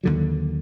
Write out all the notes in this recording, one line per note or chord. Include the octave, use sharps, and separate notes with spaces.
D#2 D3 F#3